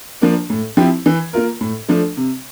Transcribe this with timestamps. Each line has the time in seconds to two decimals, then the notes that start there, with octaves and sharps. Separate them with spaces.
0.21 F3 A#3 D4
0.50 A2
0.77 F3 C4 E4 G4
1.06 E3
1.33 A#3 F4 A#4
1.61 A2
1.89 F3 A3 D4
2.17 C3